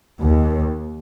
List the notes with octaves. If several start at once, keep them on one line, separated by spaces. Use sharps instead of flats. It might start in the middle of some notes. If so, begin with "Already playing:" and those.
D#2